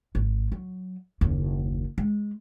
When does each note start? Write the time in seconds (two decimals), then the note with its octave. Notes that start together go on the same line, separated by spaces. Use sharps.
0.15 G#1
0.52 F#3
1.21 F#1 D#2
1.98 G#3